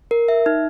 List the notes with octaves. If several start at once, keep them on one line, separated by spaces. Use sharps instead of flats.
A#4
E5
D#4